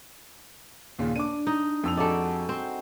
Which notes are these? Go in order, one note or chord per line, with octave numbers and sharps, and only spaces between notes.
D#2 A#2 C#3
D4 D6 D#7
D#4
F2 E6 F7
D#4 F#4 G#4 A4 D5
C4